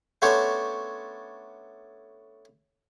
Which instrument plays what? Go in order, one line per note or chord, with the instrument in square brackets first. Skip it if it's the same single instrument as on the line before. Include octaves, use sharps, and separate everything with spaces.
[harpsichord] A3 B3 C#4 D4 C5 C#5